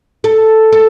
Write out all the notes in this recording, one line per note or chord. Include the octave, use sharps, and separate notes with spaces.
A4
A4